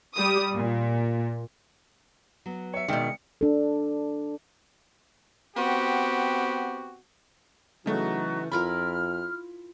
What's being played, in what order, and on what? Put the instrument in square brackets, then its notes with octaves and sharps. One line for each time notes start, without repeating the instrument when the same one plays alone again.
[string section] G3 D#6
A#2
[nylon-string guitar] F#3 B3
[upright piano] C#5 E5 [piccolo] C#7
[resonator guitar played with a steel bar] B2 D#3 [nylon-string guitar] G#3 [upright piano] D5 E5 G5
[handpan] D4 A4
[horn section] B3 C4 F#4 G4
[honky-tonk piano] C#3 A3 [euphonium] E3 [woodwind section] F#3 D#4 F#4
[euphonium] F2 [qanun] E4 F4 A#4 [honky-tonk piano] B5 [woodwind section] F6